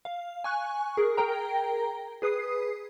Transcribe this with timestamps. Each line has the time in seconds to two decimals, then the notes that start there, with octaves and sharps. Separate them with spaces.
0.05 F5
0.44 G#5 C#6 F#6
0.97 G#4 A#4
1.17 G#4 A#4 G5 A#5
2.22 G#4 B4 D#6 C7